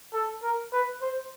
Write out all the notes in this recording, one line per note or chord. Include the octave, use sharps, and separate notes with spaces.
A4
A#4
B4
C5